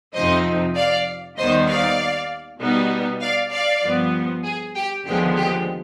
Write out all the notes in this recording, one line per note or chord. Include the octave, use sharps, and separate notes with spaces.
F2 C3 F3 C4 D#4 C5 D#5
D5 F5
D#2 D#3 G3 B3 D#4 C5 D#5
D5 F5
B2 G3 B3 D#4
D5 F5
D5 F5
G2 F3 B3
G#4
G4
D#2 D3 F3 G#3 B3 G4
G4